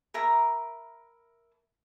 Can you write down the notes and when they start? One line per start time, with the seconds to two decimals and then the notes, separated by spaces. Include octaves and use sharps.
0.14 A#4 E5 A#5 B5